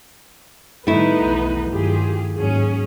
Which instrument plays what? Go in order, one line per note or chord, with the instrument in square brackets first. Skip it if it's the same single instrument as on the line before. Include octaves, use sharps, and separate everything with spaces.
[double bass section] A2 D#3 G3 [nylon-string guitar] A3 E4 [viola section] B3 D#4 B4
[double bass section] B1 E2 D#3
[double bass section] G2 D#3 F#3 [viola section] F4 G4 G#4
[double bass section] D#2 G#2 F#3 [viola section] C#4 G#4